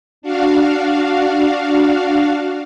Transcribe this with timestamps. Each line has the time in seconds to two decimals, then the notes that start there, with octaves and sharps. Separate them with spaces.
0.22 D4 F#4 F5